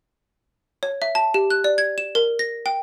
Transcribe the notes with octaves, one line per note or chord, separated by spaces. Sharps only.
C#5
E5
A5
G4
F#6
D5
G#6
E7
A#4
A#6
G5